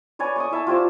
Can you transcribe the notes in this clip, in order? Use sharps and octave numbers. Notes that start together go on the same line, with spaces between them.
B4 C#5 D5 G#5
C6 C#6 D#6
E4 E5 A5
F4 G4 C5 D5